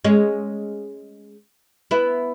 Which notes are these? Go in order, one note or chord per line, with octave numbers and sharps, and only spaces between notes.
G#3 C#4
B3 E4